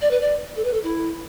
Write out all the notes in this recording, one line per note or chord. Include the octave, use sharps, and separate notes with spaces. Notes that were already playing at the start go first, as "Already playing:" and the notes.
D5
B4
D5
A4
B4
A4
E4